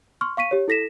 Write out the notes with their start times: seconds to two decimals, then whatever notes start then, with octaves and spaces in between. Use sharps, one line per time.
0.21 C6 C#6 F6
0.37 F5 C#6 B6 D#7
0.51 G4 C#5
0.68 E4 A4 A#6 B6 E7